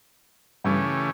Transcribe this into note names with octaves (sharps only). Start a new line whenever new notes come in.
G2 C#3 E3 A3 C#4 G4